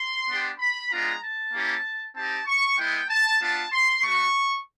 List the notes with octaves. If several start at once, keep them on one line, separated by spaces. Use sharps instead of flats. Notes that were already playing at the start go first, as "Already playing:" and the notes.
Already playing: C6
B3 D4 G4
B5
G#3 B3 D4 F4 A#5
A5
A#3 C#4 E4 G4
C4 D#4 G4 A5
C#6
G#3 B3 E4 G5
A5
B3 D4 F4 A5
C6
A3 D4 F#4 C#6